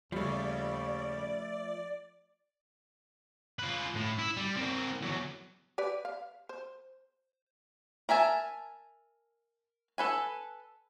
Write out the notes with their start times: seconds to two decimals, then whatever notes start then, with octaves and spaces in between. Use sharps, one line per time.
0.12 D#2 C#3 F3 G3 A3 D5
3.59 F4 B4
3.96 A2
4.19 E4
4.37 G3
4.56 C4 A#4
5.02 E2 F#3
5.78 G4 B4 D5
6.05 F5
6.49 C5
8.09 A#4 E5 G#5 A5
9.98 A4 B4 G#5